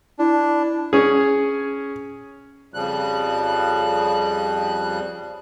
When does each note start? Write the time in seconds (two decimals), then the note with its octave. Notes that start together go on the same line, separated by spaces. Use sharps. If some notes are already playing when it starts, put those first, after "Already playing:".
0.19 D4 E4
0.93 C#4 G#4
2.74 F2 C#3 F3 G3 F#6